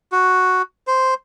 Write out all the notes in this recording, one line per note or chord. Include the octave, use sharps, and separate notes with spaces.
F#4
C5